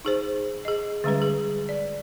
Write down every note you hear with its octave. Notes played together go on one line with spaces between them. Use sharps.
D#4 G#4 C5
G#4 D#5
D3 G3 G#3 C#4 G#4 B4
G#4
D5